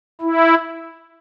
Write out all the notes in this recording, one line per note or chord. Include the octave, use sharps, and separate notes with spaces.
E4